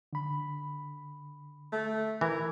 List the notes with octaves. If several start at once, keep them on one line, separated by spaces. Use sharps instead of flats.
D3 B5
A3
E3 A#4 G#6